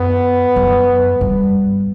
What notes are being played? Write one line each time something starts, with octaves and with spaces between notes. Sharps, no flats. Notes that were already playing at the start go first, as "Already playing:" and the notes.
Already playing: F#2 B3
F#2
G2